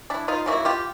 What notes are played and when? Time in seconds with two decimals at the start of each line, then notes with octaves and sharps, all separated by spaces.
0.10 D4 E4
0.28 D#4 F4
0.46 C#3 F#3 A#3 E4 F#4
0.65 F4 G4